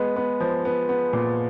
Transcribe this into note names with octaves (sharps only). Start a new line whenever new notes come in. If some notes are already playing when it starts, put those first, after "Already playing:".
Already playing: G#3 B3
B3
F3
B3
B3
A#2